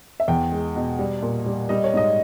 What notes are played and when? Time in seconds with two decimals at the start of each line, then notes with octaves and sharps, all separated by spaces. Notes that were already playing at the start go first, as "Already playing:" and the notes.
0.20 E5
0.28 E2 G5
0.52 G#3
0.76 B2
0.99 G3
1.22 A#2
1.46 G3
1.69 G3 D#5
1.84 C#5
1.94 G#2 D#5